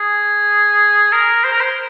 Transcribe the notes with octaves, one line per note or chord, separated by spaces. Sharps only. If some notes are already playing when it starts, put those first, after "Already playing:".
Already playing: G#4
A#4
C5
A#4
C5